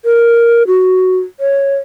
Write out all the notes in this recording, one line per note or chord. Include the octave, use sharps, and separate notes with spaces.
A#4
F#4
C#5